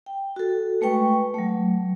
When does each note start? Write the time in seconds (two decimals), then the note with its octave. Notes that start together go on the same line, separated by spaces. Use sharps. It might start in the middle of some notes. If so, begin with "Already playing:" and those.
0.06 G5
0.36 F#4 A4
0.81 G#3 A3 B4 G5 C#6
1.34 F#3 A3